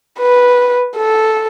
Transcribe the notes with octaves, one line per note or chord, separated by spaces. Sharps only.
B4
A4